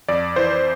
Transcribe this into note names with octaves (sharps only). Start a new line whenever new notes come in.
F2 D5
E3 C5